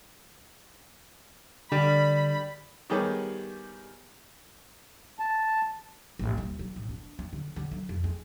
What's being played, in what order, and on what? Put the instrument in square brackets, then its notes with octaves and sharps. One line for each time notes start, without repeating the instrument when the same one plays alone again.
[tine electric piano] D3 [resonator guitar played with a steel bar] G3 [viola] B5
[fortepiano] D#3 G3 B3 G4 G#4 C#5
[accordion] A5
[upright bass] A1
D#1
F#3
A2
D4
C#4
D3
D3
F#3
F2
G#3